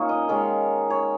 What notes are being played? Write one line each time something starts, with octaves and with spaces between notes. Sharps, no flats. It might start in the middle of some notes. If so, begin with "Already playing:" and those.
Already playing: A#2 A#3 C#4 D#4 C#5
D#5
D#3 G#3 C#5
C#5